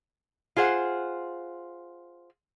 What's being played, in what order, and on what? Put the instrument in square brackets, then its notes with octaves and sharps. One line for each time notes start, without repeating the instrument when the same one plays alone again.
[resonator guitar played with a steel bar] F4 G#4 C5 F#5